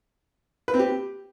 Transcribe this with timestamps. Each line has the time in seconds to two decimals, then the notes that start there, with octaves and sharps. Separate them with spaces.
0.68 B4
0.74 C4
0.79 G4